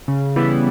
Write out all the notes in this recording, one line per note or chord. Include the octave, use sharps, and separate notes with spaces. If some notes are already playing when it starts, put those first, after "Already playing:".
C#3
E3 G3 B3 E4